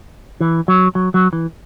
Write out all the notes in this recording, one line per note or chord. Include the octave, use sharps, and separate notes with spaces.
E3
F#3
F#3
F#3
E3